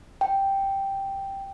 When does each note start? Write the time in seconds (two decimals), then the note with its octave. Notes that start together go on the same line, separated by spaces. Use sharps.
0.21 G5